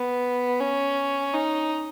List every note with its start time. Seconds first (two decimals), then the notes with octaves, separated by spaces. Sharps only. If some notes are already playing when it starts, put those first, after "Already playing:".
Already playing: B3
0.60 C#4
1.33 D#4